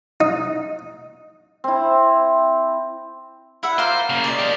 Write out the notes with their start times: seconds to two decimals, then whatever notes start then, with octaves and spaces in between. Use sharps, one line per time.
0.21 D#4
1.64 C4 E4
3.63 E4 E5 F#5
3.79 F4 A#4 C5 D6
4.10 C#3 A#3
4.24 D5 D#5
4.39 G4 A#4